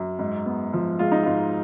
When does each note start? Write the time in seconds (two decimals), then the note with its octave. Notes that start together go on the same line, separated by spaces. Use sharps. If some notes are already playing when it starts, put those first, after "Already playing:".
Already playing: F#2
0.19 G#2
0.46 B3
0.73 F3
0.99 G#3 F4
1.12 D#4
1.23 G#2 F4